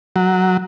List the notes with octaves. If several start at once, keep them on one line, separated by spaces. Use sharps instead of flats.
F#3